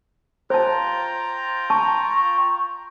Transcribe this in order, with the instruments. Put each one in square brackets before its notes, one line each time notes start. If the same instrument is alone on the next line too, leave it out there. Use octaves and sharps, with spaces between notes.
[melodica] F4 G5 A#5 [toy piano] C5 A5
[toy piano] A5 [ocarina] C#6